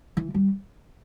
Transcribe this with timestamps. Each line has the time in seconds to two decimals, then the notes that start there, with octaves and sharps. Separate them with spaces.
0.17 E3
0.34 G3